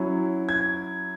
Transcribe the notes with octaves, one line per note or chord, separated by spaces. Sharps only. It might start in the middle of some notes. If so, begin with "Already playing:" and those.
Already playing: F#3 C#4 E4
G#6